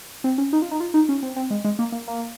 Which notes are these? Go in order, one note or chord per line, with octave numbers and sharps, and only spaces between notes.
C4
C#4
D#4
F4
D#4
F4
D#4
C#4
C4
C4
G#3
G#3
A#3
A#3
A#3